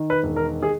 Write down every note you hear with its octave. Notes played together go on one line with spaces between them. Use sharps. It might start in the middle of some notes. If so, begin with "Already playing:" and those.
Already playing: D#3
B4
E1
A#4
G#4